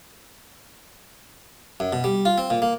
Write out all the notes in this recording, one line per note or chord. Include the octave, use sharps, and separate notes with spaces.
F#2
B2
G3
F4
C4
A#2
A#3